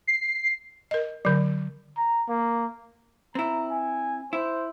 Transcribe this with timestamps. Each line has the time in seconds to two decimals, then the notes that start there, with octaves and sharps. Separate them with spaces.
0.07 C7
0.91 A#4 D#5
1.25 D3 F#3
1.98 A#5
2.28 A#3
3.35 C4 E4 A#5
3.71 G#5
4.33 E4 C5